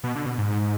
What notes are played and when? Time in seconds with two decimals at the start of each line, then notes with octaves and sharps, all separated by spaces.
0.04 B2
0.15 D3
0.26 B2
0.38 G#2